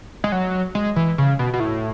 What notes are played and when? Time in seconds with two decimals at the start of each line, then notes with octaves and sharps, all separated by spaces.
0.24 G#3
0.32 F#3
0.75 G#3
0.96 E3
1.18 C#3
1.39 B2
1.54 B2
1.60 A2